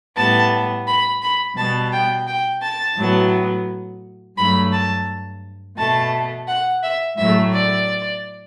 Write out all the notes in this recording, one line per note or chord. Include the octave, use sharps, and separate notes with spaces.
A2 G3 B3 A5
B5
B5
B2 G3 B3 A5
G5
G5
A5
A2 F#3 B3
G2 F#3 A3 B5
A5
B2 A3 A5
F#5
E5
A2 F#3 A3 E5
D5